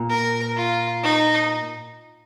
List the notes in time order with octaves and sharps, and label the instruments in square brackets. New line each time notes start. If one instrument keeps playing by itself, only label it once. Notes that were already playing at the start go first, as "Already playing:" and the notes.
Already playing: [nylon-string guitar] A#2
[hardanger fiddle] A#4
F4
D#4